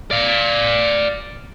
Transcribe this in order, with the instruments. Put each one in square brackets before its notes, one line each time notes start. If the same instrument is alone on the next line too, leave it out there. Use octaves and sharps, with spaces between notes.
[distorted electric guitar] D5 F5